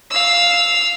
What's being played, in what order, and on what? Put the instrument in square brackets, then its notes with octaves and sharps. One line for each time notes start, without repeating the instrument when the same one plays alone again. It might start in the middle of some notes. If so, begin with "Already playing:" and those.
[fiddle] F5 E6